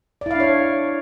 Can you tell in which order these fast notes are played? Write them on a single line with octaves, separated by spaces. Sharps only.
D5 E4 F5 D4 C#5